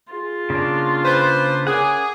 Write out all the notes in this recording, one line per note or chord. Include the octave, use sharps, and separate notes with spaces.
F4 G#4
C#3 A#3 D4
B4 C5
C#4 G#4 A#4 F#5 D6